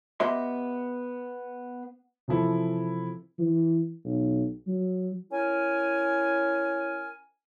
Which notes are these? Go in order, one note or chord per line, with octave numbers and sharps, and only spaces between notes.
B3 G4 D#5 E5 B5 C6
C3 E3 F3 E4 A4
E3
B1
F#3
C#4 E4 A#4 G#5